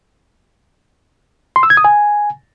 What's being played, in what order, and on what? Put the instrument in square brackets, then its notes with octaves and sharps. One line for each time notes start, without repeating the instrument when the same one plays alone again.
[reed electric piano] C6
E6
G#6
D#6
G#5